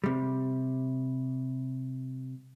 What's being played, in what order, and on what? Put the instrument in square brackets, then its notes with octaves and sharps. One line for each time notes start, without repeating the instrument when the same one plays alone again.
[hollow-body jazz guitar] C3 G3